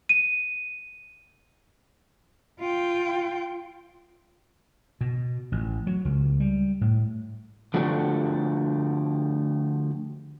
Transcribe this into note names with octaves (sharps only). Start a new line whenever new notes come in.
D#7
F4 G5
B2
A1
F#3
C#2
G3
A2
D3 F3 A3 D4 F#4 G4